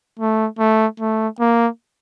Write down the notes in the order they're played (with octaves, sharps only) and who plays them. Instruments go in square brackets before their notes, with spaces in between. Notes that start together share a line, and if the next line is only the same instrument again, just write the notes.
[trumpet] A3
A3
A3
A#3